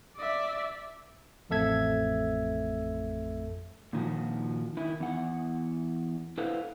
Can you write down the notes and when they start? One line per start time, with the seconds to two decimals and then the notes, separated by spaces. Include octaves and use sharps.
0.17 D5 E5
1.49 A1 F2 A3 A4 E5 G#6
3.93 A#2 D#3 F3 F#4
4.77 D#3 E4
5.00 E2 F#5
6.38 E4 A4 B4 C5 F5 F#5